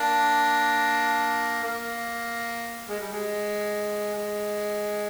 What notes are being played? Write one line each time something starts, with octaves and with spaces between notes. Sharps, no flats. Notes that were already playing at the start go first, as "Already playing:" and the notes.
Already playing: A#3 D4
A#3
G#3
G3
G#3
G#3